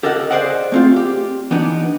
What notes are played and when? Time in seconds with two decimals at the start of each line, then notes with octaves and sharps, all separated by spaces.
0.03 G4 A4 A#4 D#5 F#5
0.31 G#4 C5 D5 D#5 F#5
0.72 A3 C4 F4
0.96 G4
1.51 E3 B3 D4 D#4